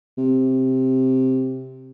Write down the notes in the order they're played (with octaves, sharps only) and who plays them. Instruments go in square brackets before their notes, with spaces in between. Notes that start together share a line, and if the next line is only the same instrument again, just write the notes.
[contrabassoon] C3